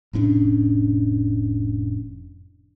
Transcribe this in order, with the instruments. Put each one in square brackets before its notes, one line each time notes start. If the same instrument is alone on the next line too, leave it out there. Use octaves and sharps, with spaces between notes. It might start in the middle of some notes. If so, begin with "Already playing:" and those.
[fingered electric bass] F1 A2 C#4 D4